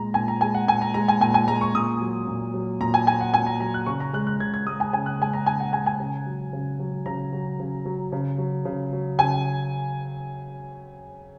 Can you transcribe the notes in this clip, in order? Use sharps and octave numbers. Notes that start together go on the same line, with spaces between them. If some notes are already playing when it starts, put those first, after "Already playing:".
Already playing: A#2 G#3 A#5
A#2 G#5
A#5
G#3 G#5
F#5
A#2 G#5
A#5
G#3 A#5
G#5
A#2 G#5
G#5
G#3 A#5
C#6
A#2 D#6
F#3
A#2
F#3
A#2 A#5
G#5
F#3 G#5
F#5
A#2 G#5
A#5
F#3 A#5
F#6
C#3 C#6
A#5
G#3 F#6
F#6
C#3 G#6
G#6
G#3 D#6
G#5
C#3 G#5
F#6
G#3 G#5
A#5
C#3 G#5
F#5
G#3 G#5
G#5
C#3
F#3
C#3
F#3
C#3 A#5
F#3
C#3
F#3
C#3
F#3
C#3
F#3
C#3 G#5